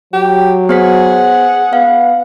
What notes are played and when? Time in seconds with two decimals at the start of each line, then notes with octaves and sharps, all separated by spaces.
0.13 F#3 G4
0.69 B3 G#4 C5 F#5 B6
1.73 B3 F5